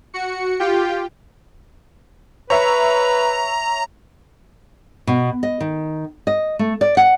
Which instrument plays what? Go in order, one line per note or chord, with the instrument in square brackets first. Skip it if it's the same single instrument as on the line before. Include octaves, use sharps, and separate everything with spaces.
[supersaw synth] F#4 C#7
F4 G4 G5
[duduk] B4 [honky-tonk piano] C#5 E5 [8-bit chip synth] A#5
[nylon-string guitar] B2
D#5
D#3
D#5
A3
D5
F#5